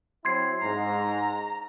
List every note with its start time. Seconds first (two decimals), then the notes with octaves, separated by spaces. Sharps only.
0.25 F#3 C4 E4 C6 G#6 C7
0.62 G#2 A#5